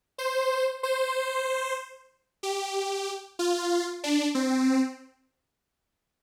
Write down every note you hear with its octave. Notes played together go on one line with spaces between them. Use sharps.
C5
C5
G4
F4
D4
C4